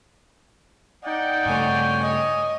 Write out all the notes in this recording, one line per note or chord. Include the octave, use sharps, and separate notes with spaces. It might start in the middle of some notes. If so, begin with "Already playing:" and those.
D#4 D5 F#5 G5
G2 C#3 A3 C#5 G#5
D#5